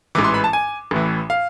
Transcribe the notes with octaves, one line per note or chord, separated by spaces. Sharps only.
A1 G#2 E3 D6
C6
B5
A5
G#5
A1 A2 E3
F5